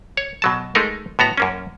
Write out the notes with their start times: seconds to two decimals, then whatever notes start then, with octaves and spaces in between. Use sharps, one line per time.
0.17 C#5
0.42 B2 F#3 A5
0.75 G#3 A3 D#4 A#4
1.19 A2 B3 F#4 A#5
1.37 F#2 A#3 C#4